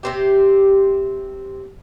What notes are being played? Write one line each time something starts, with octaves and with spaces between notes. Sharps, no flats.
C3 C4 G4